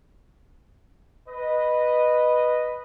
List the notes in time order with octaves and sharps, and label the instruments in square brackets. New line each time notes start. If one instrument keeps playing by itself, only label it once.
[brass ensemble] B4 D#5